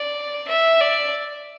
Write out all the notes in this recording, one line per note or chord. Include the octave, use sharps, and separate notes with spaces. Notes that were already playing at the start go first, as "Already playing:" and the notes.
Already playing: D5
E5
D5